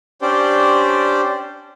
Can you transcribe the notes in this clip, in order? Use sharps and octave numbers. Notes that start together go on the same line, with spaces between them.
C#4 D4 G4 C5 D5